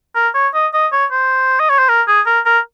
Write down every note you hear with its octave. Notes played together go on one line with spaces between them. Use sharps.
A#4
C#5
D#5
D#5
C#5
C5
D#5
C#5
C5
A#4
G#4
A#4
A#4